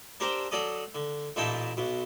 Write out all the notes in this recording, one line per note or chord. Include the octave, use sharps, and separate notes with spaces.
C4 D4 G4 A#4 C5
F#3 A4 D5 D#5 D#6
D3
A1 A#2 D#4 E4 G5 A5
B1 B2